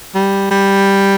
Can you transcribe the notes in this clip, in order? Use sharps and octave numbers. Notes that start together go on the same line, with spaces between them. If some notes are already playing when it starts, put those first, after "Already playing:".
G3
G3